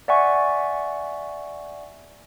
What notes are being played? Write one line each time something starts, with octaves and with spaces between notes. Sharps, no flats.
D5 E5 F#5 G#5 C#6